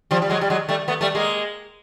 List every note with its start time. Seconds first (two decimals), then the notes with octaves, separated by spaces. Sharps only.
0.11 F3 G3
0.22 G3
0.30 F#3 G#3
0.41 G3
0.50 F#3 G#3
0.69 G3 A3
0.88 A3 B3
1.01 G3 A3
1.15 G#3 A#3